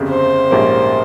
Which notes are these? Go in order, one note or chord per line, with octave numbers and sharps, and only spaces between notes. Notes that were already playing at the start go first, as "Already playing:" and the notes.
Already playing: G1 F2 C#3 G3
C5
A#1 G#2 G3 A#3 C#4